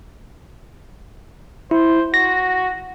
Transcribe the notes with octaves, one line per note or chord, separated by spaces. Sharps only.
E4 C5
F#4 A#6